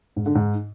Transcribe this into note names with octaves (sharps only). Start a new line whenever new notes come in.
G#2
D3
G#2